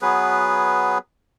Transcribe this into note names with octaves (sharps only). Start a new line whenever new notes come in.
F#3 B3 G#4 B4